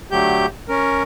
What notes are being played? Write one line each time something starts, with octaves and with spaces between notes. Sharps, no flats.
D3 F#3 A3 G4 G6
C#4 A#4